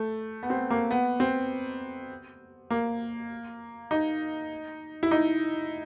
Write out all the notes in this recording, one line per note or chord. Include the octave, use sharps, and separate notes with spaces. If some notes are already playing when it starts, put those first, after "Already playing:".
Already playing: A3
B3
C4
A#3
B3
C4
A#3
D#4
E4
D#4